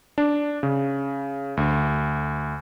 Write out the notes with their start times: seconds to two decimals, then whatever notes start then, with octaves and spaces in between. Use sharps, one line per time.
0.18 D4
0.63 C#3
1.57 D2